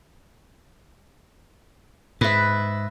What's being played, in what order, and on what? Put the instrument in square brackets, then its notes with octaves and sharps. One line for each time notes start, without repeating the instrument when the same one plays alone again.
[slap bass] G#2 [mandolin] B4 E5